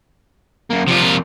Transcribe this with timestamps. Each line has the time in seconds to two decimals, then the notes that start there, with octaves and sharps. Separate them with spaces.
0.70 F#2 A#3
0.88 C3 F3 D4 F4
1.00 F2 A#2